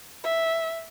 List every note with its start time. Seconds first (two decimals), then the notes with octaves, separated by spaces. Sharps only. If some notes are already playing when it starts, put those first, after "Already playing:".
0.23 E5